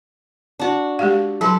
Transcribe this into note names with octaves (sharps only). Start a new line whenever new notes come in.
D4 F#4
G#3 G4 F5
F#3 A4 B4 C6